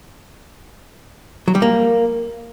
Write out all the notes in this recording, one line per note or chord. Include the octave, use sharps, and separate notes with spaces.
F#3
G3
A#3